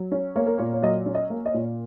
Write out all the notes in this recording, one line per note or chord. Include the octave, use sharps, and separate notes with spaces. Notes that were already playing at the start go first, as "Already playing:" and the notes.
Already playing: F#3
C#4
A#3 C#5
A#4
A#2 C#5
C#5
F#3 D#5
C#4
D#5
A#3
D#5
A#2